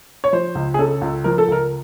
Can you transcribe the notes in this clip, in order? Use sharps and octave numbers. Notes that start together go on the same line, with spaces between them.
C#5
F3 C5
C#2
G#4
C#3 A4
C#2
F3 A#4
A4
C#2 A#4